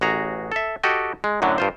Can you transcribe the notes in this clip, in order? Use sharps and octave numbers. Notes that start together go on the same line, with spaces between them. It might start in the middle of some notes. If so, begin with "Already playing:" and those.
A1 F#4 G#4 A#5
A4 E5
F#4 G4 A4 D#5 G5
G#3
F#2 A2 D3 F#3
G2 F4 C5